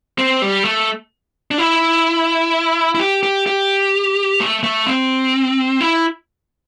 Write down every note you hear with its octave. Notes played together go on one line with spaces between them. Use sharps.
C4
G3
A3
D4
E4
E4
G4
G4
G4
A3
A3
C4
E4